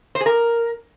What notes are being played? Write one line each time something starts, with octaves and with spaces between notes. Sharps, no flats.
C5
G#4
A#4